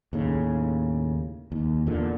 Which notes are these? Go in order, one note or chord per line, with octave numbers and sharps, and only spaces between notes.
D#2 A2 C#3
D#2
E2 A#2 D3